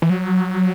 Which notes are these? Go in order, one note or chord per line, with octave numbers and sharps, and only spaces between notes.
E3
F#3